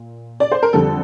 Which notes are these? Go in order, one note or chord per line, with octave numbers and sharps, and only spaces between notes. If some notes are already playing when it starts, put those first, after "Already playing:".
Already playing: A#2
D5
C5
A#4
F2 D3 G3 A4